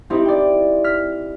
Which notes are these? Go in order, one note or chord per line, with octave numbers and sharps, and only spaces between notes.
C4 D#4 E4 G4 C5
D5 G5
F6 B6